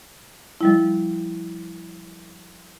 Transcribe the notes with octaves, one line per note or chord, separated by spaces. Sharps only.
F3 G3 E4